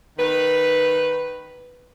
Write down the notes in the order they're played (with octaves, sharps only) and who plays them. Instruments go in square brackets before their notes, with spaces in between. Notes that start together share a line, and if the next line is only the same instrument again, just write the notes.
[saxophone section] D#3 B4